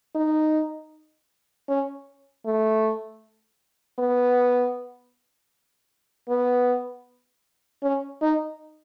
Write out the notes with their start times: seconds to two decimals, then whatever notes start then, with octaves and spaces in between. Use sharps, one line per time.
0.15 D#4
1.69 C#4
2.46 A3
3.99 B3
6.29 B3
7.83 C#4
8.21 D#4